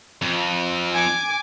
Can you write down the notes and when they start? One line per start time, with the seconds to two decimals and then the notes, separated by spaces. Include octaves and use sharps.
0.22 F2
0.92 G#5 D6